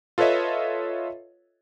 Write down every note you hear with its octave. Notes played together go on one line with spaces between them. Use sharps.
F4 A4 B4 C#5 D#5 E5